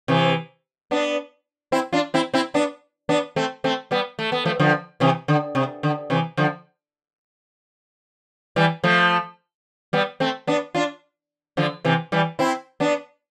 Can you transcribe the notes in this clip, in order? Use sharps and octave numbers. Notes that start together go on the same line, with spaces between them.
C3 E3
B3 D4
C4 E4
D4 F4
C4 E4
C4 E4
B3 D4
B3 D4
A3 C4
A3 C4
G3 B3
A3
B3
F3 A3
D3 F3
C3 E3
D3
C3
D3
C3 E3
D3 F3
E3 G3
F3 A3
G3 B3
A3 C4
B3 D4
D4 F4
D3 F3
C3 E3
E3 G3
C4 E4
B3 D4